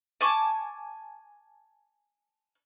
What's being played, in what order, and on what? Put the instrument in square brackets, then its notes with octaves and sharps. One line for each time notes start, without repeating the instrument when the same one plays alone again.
[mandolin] G#5 A5 C#6 D6